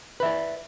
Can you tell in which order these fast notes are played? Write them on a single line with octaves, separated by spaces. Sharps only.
B4 E5 D5